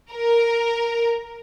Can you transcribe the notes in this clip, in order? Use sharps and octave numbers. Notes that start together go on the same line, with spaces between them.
A#4